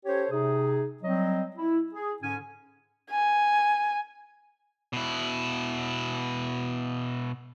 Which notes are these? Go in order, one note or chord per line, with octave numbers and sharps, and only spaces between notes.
C#4 G4 A4 C5 C#5
C3 D#4 G#4
F#3 G3 C4 D#5
E4
G#4
G#2 D3 C#4 G#5
G#5
B2 E4